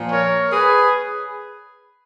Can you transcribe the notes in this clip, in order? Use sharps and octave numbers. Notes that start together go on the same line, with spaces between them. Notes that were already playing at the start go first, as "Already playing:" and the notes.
Already playing: A#2 F3
A#4 C#5
G#4 B4